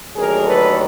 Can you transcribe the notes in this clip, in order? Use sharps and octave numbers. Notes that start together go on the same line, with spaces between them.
D#2 D3 F#3 A3 G#4 A#4
A4 B4